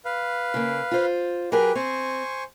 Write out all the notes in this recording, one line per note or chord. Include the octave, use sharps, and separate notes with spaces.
B4 F5
C#3 A#3
F4 C5
F#3 G4 G#4 A#4 B4
C4 C5 G#5 C#6